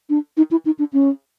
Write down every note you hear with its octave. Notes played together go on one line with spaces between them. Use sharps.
D4
D#4
E4
D#4
D4
C#4